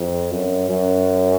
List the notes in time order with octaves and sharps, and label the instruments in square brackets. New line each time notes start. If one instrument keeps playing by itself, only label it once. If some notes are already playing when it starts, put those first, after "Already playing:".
Already playing: [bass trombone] F2
F#2
F#2